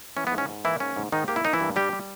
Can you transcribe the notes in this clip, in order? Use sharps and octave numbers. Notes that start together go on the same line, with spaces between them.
E3 C#4
B3
G#2
C#4
G#2
E3 A#3 E4
G#2 C#4
G#2
G#2 D#3 D#4
A#3 G4
E4
A#3 D#4
E3 E4
G2
G3 G4
G3